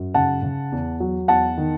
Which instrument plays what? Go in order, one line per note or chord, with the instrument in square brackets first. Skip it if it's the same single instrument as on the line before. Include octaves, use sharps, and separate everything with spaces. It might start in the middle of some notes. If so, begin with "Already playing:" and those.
Already playing: [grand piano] F#2
C#3 F#5 A5
C#3
E2
F#3
E2 F#5 A5
D#3